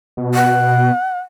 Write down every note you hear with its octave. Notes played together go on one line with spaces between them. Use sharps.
B2
F#5